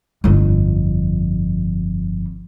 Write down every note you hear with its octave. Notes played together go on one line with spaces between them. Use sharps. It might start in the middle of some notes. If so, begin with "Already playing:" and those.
G1 F2